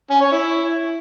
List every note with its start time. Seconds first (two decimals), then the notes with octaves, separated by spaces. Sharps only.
0.10 C#4
0.21 C#5
0.32 E4